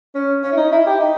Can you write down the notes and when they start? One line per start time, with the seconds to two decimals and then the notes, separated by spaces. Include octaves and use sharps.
0.15 C#4
0.44 C#4
0.52 E4
0.57 D#4
0.72 E4
0.86 G4
1.00 D#4